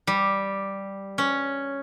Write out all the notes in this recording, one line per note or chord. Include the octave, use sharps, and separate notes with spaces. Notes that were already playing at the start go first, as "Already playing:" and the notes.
G3
C#4